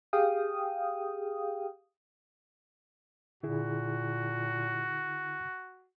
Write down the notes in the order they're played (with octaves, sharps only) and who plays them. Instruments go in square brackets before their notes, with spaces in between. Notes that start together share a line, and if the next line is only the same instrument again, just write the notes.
[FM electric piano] G4 G#4 F5 G5 D#6
[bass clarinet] A#2 [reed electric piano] D3 E4 G#4 [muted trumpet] F#4